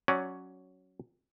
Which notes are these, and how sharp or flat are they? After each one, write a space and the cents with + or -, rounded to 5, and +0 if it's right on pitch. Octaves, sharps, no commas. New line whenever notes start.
F#3 +0 C#4 +0 D5 -5